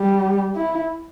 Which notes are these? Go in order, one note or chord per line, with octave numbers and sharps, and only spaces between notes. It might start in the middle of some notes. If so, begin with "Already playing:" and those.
Already playing: G3
E4